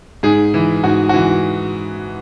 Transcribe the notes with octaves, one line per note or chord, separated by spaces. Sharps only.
G#2 G#4
E3
G#2 F#4
E3 F#4